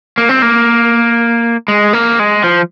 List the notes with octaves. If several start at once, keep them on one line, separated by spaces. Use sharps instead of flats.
A#3
C4
A#3
G#3
A#3
G#3
F3